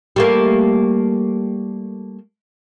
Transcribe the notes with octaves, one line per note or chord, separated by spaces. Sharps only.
G3 A3 A#3